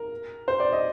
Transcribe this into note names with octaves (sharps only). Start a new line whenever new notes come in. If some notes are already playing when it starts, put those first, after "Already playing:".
Already playing: A#4
C5
D5
D#5